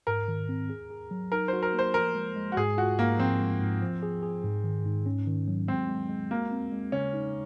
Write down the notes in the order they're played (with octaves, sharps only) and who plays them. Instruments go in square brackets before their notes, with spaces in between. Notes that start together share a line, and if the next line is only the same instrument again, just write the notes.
[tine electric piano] G#2 [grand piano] A#4
[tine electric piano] D#3
C4
G#4
G#4
F#3
[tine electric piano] D#4 [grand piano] A#4
[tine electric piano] F#4 [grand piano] C5
[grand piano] A#4
[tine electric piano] A#3
[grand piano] C5
[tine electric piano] F3 [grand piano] A#4
[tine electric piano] G#3
G#3
[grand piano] F#4
[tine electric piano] G#2 [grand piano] G#4
[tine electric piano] F4 [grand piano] F#4
[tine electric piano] G#2 [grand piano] A#3
[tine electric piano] F3 [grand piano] C4
[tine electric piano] G#3
G#2
F3
G#4
G#4
G#2
D#3
G#2
C#4
D#3
F#3
[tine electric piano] G#3 [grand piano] C4
[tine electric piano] G#3
G#3
[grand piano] A#3 [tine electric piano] F#4
[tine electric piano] C4
G#3
[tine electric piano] C#3 [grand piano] C#4
[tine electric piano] D#4